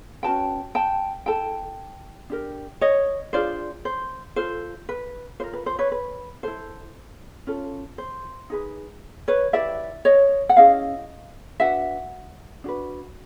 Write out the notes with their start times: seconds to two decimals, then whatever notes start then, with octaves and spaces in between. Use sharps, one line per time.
0.23 C#4 F#4 B4 G5 A5
0.75 G5 A5
1.26 E4 A4 G5 A5
2.30 D4 G4 A#4
2.81 C#5 D#5
3.33 D4 F4 G#4 C5 D5
3.85 C5
4.36 F4 A4 C5
4.89 B4
5.40 F4 A#4 C5
5.53 B4
5.66 C5
5.79 B4 C#5
5.92 B4
6.43 E4 A4 C5
7.47 C#4 F4 A4
7.98 C5
8.50 D#4 G#4 B4
9.28 B4 C#5
9.53 E4 G4 B4 D5 E5
10.05 C#5 D#5
10.49 F#5
10.57 C#4 E4 G#4 D#5 F5
11.60 D4 F#4 B4 E5 F#5
12.64 D4 F#4 B4